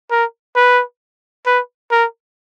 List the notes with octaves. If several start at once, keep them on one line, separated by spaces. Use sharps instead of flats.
A#4
B4
B4
A#4